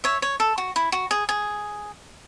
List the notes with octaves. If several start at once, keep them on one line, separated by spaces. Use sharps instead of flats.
C#5 E5
C#5
A4
F#4
E4
F#4
G#4
G#4